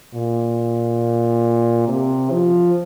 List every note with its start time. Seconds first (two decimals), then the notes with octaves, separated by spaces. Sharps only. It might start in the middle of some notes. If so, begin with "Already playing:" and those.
0.14 A#2
1.88 C3
2.32 F3